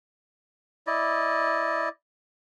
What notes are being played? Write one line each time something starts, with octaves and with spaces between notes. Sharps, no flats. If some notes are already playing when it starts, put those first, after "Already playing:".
E4 D5 D#5